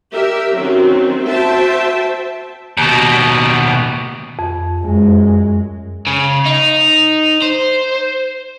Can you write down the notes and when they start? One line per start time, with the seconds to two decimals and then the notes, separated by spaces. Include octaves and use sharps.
0.12 G4 A#4 E5
0.56 D#3 F#3 C4 C#4
1.24 F#4 C5 E5 G5 A5
2.77 D#2 B2
4.39 F2
4.81 F#2 G#3
6.07 C#3
6.46 D#4
7.42 C5